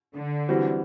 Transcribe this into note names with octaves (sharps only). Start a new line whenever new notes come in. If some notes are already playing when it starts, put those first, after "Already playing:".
D3
E3 G3 C4 F#4